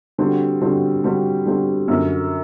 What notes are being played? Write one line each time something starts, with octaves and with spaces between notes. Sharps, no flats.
D3 G3 C4 F#4
D3 G3 C4 F#4
D3 G3 C4 F#4
D3 G3 C4 F#4
F#2 D3 F#3